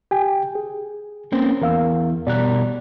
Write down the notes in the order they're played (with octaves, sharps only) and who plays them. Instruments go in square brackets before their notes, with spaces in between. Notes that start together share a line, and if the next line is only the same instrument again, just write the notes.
[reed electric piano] G4 G5 G#5
G#4
[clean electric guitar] A#3 C4 C5 [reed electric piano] C#4
[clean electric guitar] E2 [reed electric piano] A#4 F5 E6
[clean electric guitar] B2 G3 A#4 [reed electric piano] D5 F#6